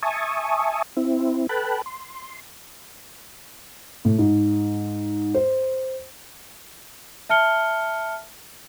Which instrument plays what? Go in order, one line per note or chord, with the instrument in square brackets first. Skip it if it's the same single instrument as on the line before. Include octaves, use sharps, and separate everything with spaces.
[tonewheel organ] E5 G#5 A5 C#6 D#6
C4 E4
A4 B4 G5 A5 B5 F#6
C6
[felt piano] A2
G#2
C5
[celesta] E5 A5 F6 C#7 G7